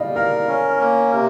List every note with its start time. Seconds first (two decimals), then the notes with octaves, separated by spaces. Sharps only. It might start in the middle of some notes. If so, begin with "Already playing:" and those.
Already playing: G3 D#5 F5
0.15 A#4 F5
0.48 C#4
0.80 A#3
1.13 C3